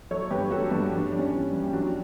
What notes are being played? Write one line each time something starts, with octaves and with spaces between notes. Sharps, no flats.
F#3 A4 C#5
G2 G4 B4
G2 F#4 A4
G2 D4
G3 D4
G3 D4
C#4
E3
G3
G4
F#3 D4 F#4